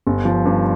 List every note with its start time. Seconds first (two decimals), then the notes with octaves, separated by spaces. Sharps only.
0.07 G1
0.25 F3
0.45 G2